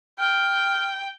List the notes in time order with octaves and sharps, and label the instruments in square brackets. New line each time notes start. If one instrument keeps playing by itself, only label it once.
[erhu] G5 [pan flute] F6